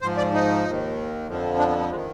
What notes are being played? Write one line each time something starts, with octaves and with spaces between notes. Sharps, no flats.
G#2 F3 C5
D5
D#4
D#2 D#3
F2 D3 F3
D4
B3
B3
G#3
D#3